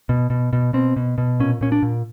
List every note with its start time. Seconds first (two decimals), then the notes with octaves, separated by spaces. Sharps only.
0.09 B2
0.30 B2
0.53 B2
0.73 B2 C4
0.96 B2
1.18 B2
1.40 A#2 C#4
1.61 A#2 C#4
1.72 D4
1.82 A#2